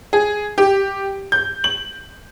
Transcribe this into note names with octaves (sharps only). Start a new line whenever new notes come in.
G#4
G4
G6
F#7